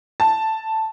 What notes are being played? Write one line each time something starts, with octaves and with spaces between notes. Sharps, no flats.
A5